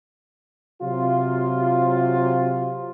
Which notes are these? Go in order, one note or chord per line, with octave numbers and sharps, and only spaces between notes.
C3 F#3 F4